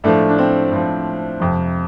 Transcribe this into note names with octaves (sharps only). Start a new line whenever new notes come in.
A2 F3 A3 D4
D4
C4
A2 F3
F2 C3 F3